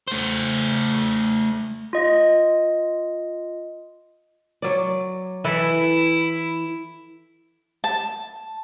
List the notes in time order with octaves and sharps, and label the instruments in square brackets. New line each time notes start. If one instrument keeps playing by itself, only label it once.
[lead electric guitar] A3 C5
[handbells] F4 D#5
[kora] F#3 D5
[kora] E3 A4 B4 [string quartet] E4
[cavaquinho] A5